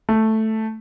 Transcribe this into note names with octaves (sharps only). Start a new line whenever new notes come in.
A3